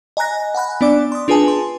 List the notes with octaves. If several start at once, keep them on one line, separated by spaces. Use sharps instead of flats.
D#5 G#5 A#5 F#6 A#6
F#5 G#5 B5 F#6
B3 D4 D5 D6
C6 D#6
D4 F4 G#4 B4 G#5 A5
C6